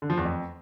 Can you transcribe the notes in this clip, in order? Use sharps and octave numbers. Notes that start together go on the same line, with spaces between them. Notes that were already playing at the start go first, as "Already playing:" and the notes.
D3
F3
E2
F2